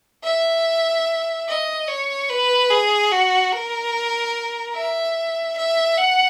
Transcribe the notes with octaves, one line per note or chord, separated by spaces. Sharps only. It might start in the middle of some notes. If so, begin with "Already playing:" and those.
E5
D#5
C#5
B4
G#4
F#4
A#4
E5
E5
F#5